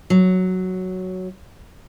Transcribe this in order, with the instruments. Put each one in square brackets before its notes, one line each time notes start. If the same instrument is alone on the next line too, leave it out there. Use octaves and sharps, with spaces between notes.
[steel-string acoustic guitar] F#3